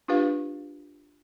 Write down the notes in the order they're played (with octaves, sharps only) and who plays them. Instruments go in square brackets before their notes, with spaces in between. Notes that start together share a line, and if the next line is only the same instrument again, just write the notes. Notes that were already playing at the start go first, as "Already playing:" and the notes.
[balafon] D4 F4 G4 B4 F5